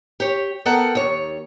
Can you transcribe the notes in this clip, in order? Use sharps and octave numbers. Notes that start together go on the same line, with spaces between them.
G4 C#5
B3 A4 A#4 F#5 G5
D#2 C#5